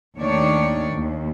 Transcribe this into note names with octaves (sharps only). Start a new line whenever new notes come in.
D#2 D#3 A3 D4 C#5 D5
D#2